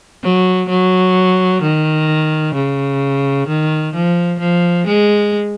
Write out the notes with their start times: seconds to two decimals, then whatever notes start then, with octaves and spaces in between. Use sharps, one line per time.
0.23 F#3
0.69 F#3
1.62 D#3
2.55 C#3
3.48 D#3
3.94 F3
4.39 F3
4.86 G#3